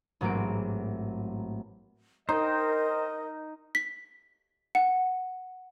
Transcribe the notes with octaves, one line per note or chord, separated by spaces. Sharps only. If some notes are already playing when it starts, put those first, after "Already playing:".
A1 G#2 F#3 A#3 C4 D7
D#4 A#4 C5 D#5 G5
B6
F#5